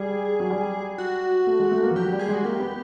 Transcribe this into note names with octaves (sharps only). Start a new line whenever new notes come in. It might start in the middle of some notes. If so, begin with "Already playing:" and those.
Already playing: G3 G#4
F#3
G3
F#4
A3
G#3
A3
A#3
F3
F#3 G4
G3
G#4
G#3 F#4
A#3 G4
B3